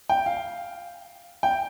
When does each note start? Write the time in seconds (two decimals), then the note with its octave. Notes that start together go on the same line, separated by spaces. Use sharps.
0.09 G5
0.26 F5
1.43 G5